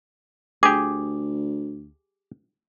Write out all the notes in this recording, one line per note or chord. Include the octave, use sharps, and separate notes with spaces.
D2 G4 G#4 D6